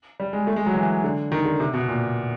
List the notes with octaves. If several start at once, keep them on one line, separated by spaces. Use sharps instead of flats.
G3
G#3
A3
G#3
F#3
E3
D3
D#3
D3
C3
B2
A#2